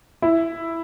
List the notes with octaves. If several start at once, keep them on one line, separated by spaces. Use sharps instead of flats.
E4